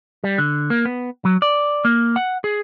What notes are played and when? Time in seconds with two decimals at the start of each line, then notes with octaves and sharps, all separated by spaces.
0.24 G3
0.38 D3
0.70 A#3
0.85 B3
1.25 F#3
1.42 D5
1.85 A#3
2.16 F#5
2.44 G#4